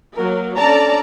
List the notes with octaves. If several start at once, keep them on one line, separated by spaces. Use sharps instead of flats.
F#3 A#3 A#4
C#4 D4 A4 D5 A5 A#5